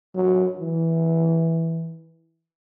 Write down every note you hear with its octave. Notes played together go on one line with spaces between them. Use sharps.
F#3
E3